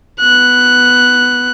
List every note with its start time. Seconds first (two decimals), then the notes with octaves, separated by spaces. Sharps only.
0.20 B3 F#6